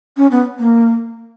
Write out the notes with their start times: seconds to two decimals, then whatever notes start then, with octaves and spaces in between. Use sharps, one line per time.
0.16 C#4
0.31 B3
0.59 A#3